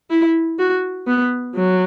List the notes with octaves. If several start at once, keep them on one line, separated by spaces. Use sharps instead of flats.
E4
F#4
B3
F#3